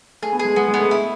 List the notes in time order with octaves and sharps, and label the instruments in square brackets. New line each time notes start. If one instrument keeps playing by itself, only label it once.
[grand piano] A3 [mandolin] G#4
[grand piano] B3
[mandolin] G#4
[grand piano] G#3
[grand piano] G#3 [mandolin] B3
[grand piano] G#3
[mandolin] B3
[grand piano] A3
[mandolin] E4